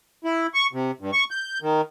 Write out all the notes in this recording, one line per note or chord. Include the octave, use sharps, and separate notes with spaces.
E4
C#6
C3
G2
C#6
G6
D#3